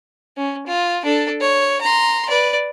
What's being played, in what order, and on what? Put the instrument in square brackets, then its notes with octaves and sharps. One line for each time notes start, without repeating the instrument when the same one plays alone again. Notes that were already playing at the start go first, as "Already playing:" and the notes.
[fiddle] C#4
F4
D4 A4
C#5
A#5 C6
B4 D5